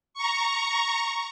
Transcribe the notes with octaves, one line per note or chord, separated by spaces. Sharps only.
A#5 C#6